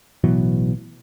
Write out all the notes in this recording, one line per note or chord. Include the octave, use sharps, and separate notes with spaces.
A1 B2 E3 F#3